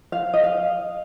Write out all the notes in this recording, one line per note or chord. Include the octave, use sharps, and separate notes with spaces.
F5
D#5
F5